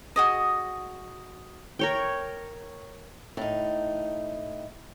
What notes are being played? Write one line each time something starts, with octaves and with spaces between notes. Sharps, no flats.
F#4 G#4 D#5
A#4 C#5 G5
A2 D#4